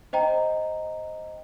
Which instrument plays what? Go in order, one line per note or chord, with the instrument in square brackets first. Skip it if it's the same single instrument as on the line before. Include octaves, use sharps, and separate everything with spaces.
[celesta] C5 D#5 G5 A#5